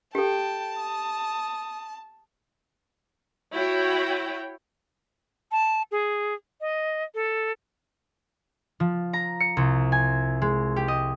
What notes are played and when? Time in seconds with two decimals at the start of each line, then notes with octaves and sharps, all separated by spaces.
0.15 G4 A4 G5 A5
0.79 D#6
3.53 E4 F#4 C#5 G5
5.52 A5
5.91 G#4
6.61 D#5
7.15 A4
8.80 F3
9.13 A#5
9.40 C#7
9.57 C2
9.92 G#5
10.42 G#3
10.76 G4
10.88 D#5